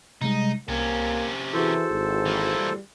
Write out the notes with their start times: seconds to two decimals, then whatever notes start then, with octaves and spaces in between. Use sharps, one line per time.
0.21 C3 G3 G#3 D#4
0.68 C2 C3 A#3 C#4
1.53 E3 E4 F#4 G#4 A4 C5
1.90 G#1
2.26 E3 A#3
2.58 G3